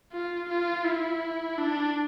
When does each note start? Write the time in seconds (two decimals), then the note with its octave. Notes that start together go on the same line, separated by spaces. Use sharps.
0.12 F4
0.49 F4
0.85 E4
1.58 D4